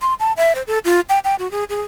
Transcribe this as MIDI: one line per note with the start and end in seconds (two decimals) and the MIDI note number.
0.02 0.14 84
0.20 0.33 81
0.37 0.55 76
0.55 0.63 72
0.67 0.79 69
0.85 1.00 65
1.09 1.19 79
1.25 1.35 79
1.39 1.50 66
1.51 1.64 68
1.70 1.82 68